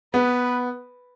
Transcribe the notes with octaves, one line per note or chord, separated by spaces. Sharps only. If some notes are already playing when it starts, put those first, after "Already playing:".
B3 B4